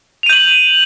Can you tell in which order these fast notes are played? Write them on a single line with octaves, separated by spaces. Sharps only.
F7 D#7 G6 F#7